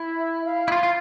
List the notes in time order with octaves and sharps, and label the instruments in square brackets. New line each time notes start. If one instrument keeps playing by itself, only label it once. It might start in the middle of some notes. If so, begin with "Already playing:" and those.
Already playing: [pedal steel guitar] E4
[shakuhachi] E5
F5
[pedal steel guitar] E4
F4
F4